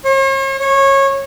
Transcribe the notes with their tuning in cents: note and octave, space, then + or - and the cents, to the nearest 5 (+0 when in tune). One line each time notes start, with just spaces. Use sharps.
C#5 -45
C#5 -20